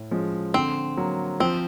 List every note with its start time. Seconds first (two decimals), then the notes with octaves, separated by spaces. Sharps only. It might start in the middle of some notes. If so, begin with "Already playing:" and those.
Already playing: A2
0.11 F3 G#3 C#4
0.54 D3 C4
0.97 F#3 A#3
1.40 F3 C4